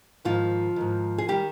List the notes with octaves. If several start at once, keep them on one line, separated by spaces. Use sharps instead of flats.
G#2 D#3 F3 F4
G#2 D#3
G#4
D#3 G3 G4